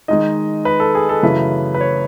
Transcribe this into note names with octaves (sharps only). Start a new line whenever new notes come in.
D#3 G#3 D#4 D#5
B4
A4
G#4
A4
F#2 C#3 E3 A3 B4
B4
C#5